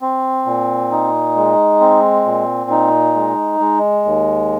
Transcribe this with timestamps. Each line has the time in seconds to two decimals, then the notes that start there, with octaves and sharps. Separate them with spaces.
0.02 C4
0.46 A#2
0.92 D#4
1.36 G#3
1.80 C4
2.26 A#2
2.70 D#4
3.15 G#3
3.60 G#3
4.05 D#2